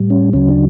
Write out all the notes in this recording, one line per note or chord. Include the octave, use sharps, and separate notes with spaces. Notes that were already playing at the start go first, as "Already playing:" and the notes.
Already playing: A2 G3
C#4
D2 C#3 F#3 C#4
D4